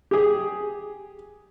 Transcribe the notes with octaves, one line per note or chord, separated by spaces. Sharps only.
G4 G#4